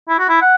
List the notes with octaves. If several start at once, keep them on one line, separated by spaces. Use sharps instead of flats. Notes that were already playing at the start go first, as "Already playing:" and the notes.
E4
F#4
E4
F#5